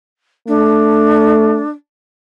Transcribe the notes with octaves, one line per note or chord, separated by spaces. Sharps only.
A3 D4